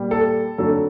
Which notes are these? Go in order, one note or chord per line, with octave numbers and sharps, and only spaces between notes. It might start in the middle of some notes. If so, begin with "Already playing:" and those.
Already playing: A#2 G3
A4
F2 D3 F#3 A4